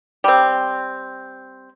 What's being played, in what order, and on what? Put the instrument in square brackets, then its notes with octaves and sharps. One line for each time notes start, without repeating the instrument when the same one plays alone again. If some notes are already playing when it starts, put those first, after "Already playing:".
[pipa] G3 C4